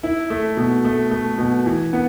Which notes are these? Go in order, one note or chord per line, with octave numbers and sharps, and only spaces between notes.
E4
A3
B2
A3
A3
B2
E3
B3